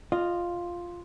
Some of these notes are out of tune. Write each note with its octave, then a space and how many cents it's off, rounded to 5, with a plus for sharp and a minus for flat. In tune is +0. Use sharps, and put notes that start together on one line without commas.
F4 +0 D#5 -20